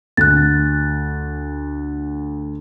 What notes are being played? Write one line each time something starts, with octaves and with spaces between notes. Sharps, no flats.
D2 F#6 A6